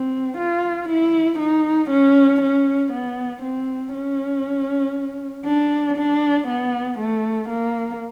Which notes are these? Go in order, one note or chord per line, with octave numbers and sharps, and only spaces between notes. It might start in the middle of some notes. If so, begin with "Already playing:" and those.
Already playing: C4
F4
E4
D#4
C#4
C#4
B3
C4
C#4
D4
D4
B3
A3
A#3